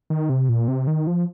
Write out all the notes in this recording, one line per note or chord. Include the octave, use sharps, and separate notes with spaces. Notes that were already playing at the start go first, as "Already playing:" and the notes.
D#3
C3
A#2
C3
D#3
F3